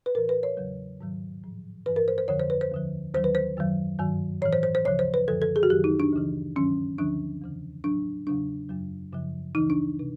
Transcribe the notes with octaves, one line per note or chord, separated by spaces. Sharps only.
B4
A2 E3 A#4
B4
C#5
E2 C#3 F#3
G#2 D#3 F#3
A2 F3
G2 E3 B4
A#4
C5
C5
F2 D3 F3 C#5
C5
B4
C5
D#2 D3 F3
D#2 D#3 F#3 C5
B4
C5
F#2 D#3 F#3
G2 D#3 F#3
A2 E3 C#5
C5
C5
C5
D2 C#3 F3 C#5
C5
B4
F#2 D3 F3 A4
A4
G#4
F#4
F#2 D#3 F#3 G4
D#4
D4
D2 C#3 E3
G2 D#3 F#3 C#4
D2 D3 F3 D4
E2 C#3 E3
A2 F#3 D4
E2 C#3 F#3 D4
F#2 C#3 F#3
F#2 C#3 F3
D2 C#3 E3 D#4
D4
C3